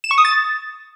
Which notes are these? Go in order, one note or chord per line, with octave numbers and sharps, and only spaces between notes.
E7
C#6
D#6
A6